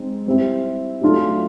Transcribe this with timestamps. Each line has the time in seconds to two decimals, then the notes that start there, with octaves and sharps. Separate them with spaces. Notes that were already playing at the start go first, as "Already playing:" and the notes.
Already playing: G#3 C4 D#4
0.26 G3 C4 E4
1.01 F#3 A3 D4 F4 A4